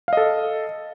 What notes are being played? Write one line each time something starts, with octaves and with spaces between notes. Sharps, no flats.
A4 D#5 F5